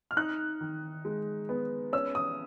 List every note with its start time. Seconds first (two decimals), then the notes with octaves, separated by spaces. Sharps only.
0.11 F6
0.17 D#4 F#6
0.61 D#3
1.05 G#3
1.49 B3
1.93 C#4 E6
2.15 D#6